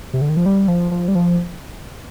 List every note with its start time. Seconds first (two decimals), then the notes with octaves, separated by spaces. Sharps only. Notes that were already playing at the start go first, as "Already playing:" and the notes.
0.13 C3
0.21 D3
0.29 D#3
0.37 F3
0.46 G3
0.68 F3
0.91 F3
1.08 G3
1.15 F3